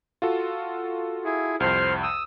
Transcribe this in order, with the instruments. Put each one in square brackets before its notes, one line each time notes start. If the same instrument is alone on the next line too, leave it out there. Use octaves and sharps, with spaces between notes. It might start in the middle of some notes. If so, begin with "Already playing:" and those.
[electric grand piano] F4 F#4 A4
[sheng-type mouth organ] E4 G#4
[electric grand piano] C2 F2 [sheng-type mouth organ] C5 F6
[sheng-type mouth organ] D#6 E6